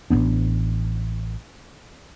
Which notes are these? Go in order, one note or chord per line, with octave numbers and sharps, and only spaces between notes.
A1 D3 B3 D4